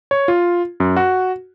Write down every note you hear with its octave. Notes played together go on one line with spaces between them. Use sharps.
C#5
F4
F#2
F#4